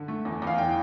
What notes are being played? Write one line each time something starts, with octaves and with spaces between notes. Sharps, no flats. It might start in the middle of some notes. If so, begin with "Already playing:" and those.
Already playing: D3
A3
E2
E2 F5
E3 G5